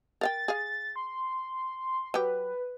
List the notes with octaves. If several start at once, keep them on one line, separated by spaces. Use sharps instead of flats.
A#4 F5 G5 A6
G#4 F5
C6
F#3 G4 B4